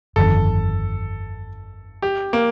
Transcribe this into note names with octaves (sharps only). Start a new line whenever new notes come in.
G1 F2 D#3 A4
G4
A#3